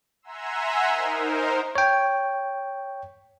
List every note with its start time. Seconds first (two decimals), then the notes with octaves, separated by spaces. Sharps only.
0.22 E5 F#5 G#5 A#5 C6 E6
0.86 D#4 A#4 C5
1.75 C#5 G5